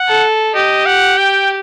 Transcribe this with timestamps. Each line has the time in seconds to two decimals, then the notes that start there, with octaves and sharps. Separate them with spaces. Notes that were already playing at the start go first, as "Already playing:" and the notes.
Already playing: F#5
0.08 A4
0.55 G4 D#5
0.86 F#5
1.17 G5